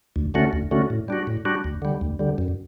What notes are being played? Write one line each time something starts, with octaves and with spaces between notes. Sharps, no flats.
D2
D3 A3 C#4 F#4
D2
D3 A3 C#4 F#4
A2
G3 D4 F#4
A2
G3 D4 F#4
D2
D3 G3
D2
D3 G3
F#2